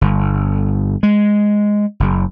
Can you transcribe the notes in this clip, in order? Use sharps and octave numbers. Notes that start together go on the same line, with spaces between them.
G1
G#3
F#1